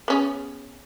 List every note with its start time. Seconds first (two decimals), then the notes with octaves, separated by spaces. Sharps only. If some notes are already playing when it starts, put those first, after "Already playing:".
0.08 B3 C#4 G#4